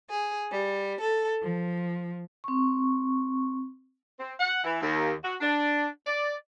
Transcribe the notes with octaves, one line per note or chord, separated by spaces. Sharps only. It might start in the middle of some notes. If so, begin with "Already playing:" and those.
G#4
G3
A4
F3
C4 C#6
C4
F#5
E3
D#2
F#4
D4
D5